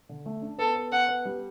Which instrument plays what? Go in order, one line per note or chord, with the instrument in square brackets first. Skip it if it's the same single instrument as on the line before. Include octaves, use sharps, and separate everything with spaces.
[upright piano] D3
A3
D4
[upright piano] B3 [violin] A4
[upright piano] B3
[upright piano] B3 [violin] F#5
[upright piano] B3
G3